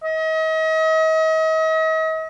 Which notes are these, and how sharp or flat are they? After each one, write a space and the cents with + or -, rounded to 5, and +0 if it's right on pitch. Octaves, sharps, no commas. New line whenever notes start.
D#5 +40